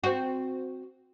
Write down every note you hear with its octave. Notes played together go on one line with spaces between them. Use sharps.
C4 F#4